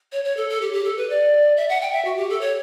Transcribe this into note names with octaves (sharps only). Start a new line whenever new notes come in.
C#5
C#5
A4
A4
G4
G4
A4
B4
D5
E5
F#5
G5
E5
F#4
G4
A4
C#5